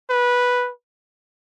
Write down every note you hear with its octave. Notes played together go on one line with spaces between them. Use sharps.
B4